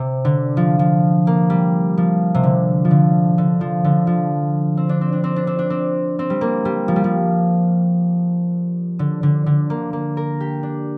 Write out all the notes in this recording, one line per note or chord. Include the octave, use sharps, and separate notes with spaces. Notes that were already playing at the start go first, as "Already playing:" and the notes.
Already playing: C3
D3
F3
F3
A#3
G3
F3
C3
D3
F3
D3
D3
F3
D3
F3
C4
D4
C4
D4
C4
D4
C4
D4
C4
C4
G3
A#3
G3
F3
G3
F3
D3
D3
D3
A#3
A#3
A#4
G4
D4